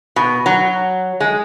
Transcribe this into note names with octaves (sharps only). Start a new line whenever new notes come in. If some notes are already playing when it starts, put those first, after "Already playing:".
B2
F#3
G#3